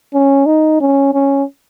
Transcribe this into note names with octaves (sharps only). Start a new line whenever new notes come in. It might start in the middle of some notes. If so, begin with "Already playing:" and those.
C#4
D#4
C#4
C#4